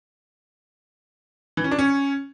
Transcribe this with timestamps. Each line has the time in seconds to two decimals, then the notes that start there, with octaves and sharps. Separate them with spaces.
1.57 E3
1.64 C#4
1.71 D4
1.79 C#4